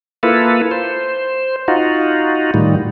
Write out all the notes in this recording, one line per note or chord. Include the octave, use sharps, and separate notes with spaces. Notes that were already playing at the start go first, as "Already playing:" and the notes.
A#3 E4 F4 A4 B4
C5
D#4 F4 F#4
A2 D#3 G3